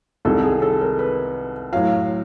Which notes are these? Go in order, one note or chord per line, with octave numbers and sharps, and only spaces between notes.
C2 C3 D#3 G#3 A4
G#4
A4
A#4
B4
A2 F#3 F5